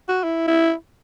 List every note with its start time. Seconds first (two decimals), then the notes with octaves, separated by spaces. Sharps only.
0.09 F#4
0.24 E4
0.48 E4